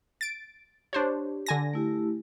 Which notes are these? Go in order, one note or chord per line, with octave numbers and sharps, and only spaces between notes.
A6 D7
D4 G4 C5 C#5
D3 G#5 A#6
A3 E4 G4